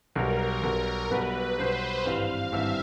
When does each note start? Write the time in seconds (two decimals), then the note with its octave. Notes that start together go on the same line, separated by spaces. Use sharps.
0.15 B1 B2 G3 A#4
0.63 B1 B2 G3 A#4
1.10 B1 B2 G3 B4
1.58 B1 B2 G3 C5
2.05 G#1 G2 E3 G3 C4 F5
2.52 G#1 G2 E3 G3 C4 E5